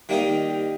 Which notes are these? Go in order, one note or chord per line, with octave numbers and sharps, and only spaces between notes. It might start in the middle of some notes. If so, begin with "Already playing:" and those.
D#3 G3 A#3 D#4 D#5
D#5
G4